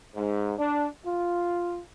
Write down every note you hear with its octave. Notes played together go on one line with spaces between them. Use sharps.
G#2
D4
F4